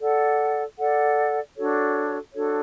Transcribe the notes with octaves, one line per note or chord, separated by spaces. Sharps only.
A4 D5 F#5
A4 D5 F#5
D4 F#4 A4 C#5
D4 F#4 A4 C#5